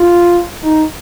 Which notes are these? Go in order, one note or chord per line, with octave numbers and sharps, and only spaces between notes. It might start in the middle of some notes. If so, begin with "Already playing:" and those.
Already playing: F4
D#4